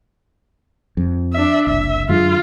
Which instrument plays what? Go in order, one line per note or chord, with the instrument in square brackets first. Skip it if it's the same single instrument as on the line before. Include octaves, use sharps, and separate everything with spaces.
[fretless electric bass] F2
[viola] D4 E5
[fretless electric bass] F#1 C2 [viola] E5
[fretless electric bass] F#2 D3 G#3 [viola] F4